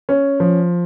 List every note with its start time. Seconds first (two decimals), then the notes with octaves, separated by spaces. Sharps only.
0.09 C#4
0.40 F3